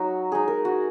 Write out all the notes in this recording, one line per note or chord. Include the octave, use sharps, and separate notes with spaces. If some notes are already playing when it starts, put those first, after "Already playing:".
Already playing: F#3 D#4 F#4
G#3 D#4 G#4
A#4
F#4